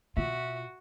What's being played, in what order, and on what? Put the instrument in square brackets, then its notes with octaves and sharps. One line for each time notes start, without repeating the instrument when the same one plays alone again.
[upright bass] B2 F4 [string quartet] F#4 [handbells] E5